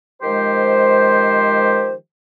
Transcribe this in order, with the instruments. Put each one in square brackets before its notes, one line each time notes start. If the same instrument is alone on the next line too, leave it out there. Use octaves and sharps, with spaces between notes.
[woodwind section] D#3 F3 G#3 G4 C5